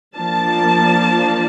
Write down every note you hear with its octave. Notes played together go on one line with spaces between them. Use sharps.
F3 A#3 D4 A5